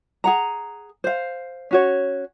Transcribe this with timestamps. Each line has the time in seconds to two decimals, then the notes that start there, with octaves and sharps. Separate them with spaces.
0.24 G#4 F#5 A#5
1.04 C5 F5
1.71 C#4 F#4 C#5